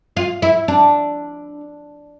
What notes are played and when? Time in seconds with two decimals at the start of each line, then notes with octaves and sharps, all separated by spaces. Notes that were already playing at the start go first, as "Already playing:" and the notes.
0.17 F4
0.42 E4
0.68 D4